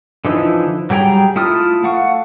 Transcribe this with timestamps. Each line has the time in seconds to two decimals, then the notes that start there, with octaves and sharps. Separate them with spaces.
0.25 D3 E3 F3 D#4 E4
0.90 F#3 G3 G#4 G5 A#5
1.36 A3 E4 F4 D#6 F6
1.84 A3 F5 F#5 C#6